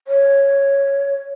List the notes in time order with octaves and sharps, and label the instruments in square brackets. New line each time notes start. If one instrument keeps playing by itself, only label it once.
[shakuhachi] C#5